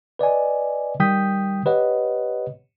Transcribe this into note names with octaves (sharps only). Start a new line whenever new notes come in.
B4 D5 D#5 G#5
D#3 G3 G5 D#6 G6 B6
G4 B4 C#5 D#5 F#5